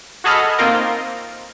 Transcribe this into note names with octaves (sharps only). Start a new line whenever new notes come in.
F#4 G#4 A4 D#5 B5 F6
A#3 C4 D#4 F4 A#4